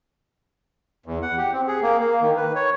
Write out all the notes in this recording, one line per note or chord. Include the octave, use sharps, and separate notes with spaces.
E2
F#5
G4
C4
G#4
A#3
A#3
D#3
B4
C#5